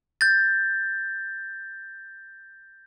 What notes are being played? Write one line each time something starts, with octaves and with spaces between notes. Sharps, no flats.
G6 A6